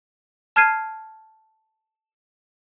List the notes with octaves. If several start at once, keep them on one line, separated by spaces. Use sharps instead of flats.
A5 F6 G#6 C7 D#7